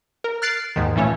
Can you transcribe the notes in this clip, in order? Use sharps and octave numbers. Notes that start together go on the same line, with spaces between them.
A#4
F6 F#6 A6 C7 D7
D#2 G#2 D#3
A#2 E3 A3 C#4